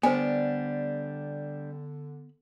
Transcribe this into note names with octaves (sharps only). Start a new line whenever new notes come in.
D3 G3 B3 D4 C5 G#5